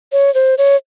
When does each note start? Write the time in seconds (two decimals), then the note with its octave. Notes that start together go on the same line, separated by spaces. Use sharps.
0.12 C#5
0.34 C5
0.58 C#5